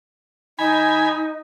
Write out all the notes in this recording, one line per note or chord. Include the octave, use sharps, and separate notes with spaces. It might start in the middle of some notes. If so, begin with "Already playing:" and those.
D#4 G#5 B5